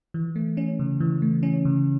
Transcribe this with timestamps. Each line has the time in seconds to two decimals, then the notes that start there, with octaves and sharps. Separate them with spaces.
0.14 E3
0.36 A3
0.57 C#4
0.79 C#3
1.00 E3
1.22 A3
1.43 C#4
1.65 C#3